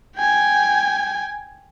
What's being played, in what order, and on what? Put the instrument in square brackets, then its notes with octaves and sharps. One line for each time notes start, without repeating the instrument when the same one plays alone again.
[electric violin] G5 G#5